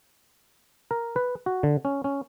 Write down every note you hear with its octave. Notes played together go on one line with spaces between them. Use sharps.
A#4
B4
F#4
D3
C#4
C#4